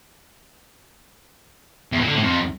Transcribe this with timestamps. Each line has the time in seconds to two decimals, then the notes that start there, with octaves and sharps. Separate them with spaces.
1.92 E2
2.00 A#2
2.08 D3
2.15 A2
2.23 F2